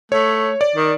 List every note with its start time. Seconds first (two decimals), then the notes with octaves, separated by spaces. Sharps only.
0.12 A3 C#5
0.61 D5
0.75 D#3